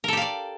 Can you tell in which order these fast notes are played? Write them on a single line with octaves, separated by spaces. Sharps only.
A#4 A4 G4 F5 D5